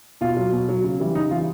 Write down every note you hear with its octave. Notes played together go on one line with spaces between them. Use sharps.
B2 F4
F#3
B2
F#3
C#3
E3 G3
C#3 D#4
E3 G3 F4